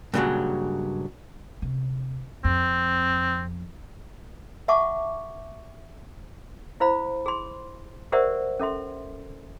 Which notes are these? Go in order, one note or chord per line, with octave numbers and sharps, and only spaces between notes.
G2 A#2 C#3 E3 F#3 G#3
C3
F2 C4
E5 F#5 A5 C#6 D6
E4 C5 F5 B5
G#4 C6
G4 A#4 C5 D5 E5 F#5
C#4 A4 E5 C6